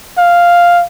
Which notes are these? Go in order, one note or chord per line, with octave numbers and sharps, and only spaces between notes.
F5